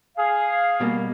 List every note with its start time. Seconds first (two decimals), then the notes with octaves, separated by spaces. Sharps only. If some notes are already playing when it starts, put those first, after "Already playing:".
0.18 G#4 F5
0.80 B2 G3 A#3